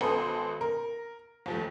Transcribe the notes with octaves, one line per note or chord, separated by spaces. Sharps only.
G#1 B3 A4 C5 G#5 D#6
A#4
D#2 F3 A3